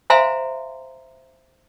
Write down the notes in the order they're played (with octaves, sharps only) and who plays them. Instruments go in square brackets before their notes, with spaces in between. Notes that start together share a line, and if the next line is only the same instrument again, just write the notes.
[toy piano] C5 E5 F5 G#5 A#5 C6